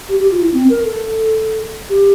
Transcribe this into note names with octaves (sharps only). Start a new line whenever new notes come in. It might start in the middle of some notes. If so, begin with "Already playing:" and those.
G4
G4
F4
E4
C4
A#4
A4
G4